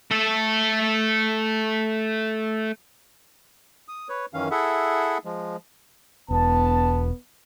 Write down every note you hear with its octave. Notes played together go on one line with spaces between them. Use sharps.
A3 A4
D#6
B4 C#5
F#2 D#3 E3 C#4 F5
E4 G#4 A4 E5 F#5
F3 G#3
E1 B3 A5